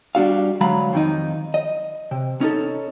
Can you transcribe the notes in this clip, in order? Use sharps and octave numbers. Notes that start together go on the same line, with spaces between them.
G3 D4 F#4 F5
D2 F#3 G#3 F5 A#5 B5
F2 D#3 D#4
D#5
C3
C#4 D#4 A4